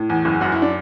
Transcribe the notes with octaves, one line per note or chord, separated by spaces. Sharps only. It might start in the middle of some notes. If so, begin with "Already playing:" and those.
Already playing: A2
E2
F#1
F#2 F#4
E4
D4